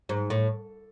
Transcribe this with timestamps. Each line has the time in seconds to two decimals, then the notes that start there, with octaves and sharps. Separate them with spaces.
0.09 G#2
0.30 A2